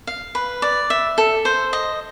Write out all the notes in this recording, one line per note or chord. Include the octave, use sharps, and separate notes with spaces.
F5
B4
D5
E5
A4
C5
D#5